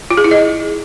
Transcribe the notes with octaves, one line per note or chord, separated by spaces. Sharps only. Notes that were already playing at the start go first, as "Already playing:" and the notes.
F4
G#4
E4
D#5